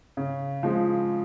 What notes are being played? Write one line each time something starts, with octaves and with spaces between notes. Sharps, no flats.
C#3
F3 G#3